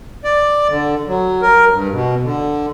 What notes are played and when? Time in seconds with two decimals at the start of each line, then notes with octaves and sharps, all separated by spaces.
0.24 D5
0.69 D3
1.07 F#3
1.42 A#4
1.72 G2
1.91 B2
2.23 D3